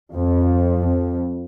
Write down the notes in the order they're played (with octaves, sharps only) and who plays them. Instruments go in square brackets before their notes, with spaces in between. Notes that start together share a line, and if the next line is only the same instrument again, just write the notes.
[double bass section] F2